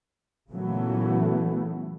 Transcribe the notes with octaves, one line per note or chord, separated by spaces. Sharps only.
A#2 C#3 E3 F#3 A3 B3